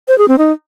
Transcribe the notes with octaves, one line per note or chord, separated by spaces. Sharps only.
C5
G#4
C4
D#4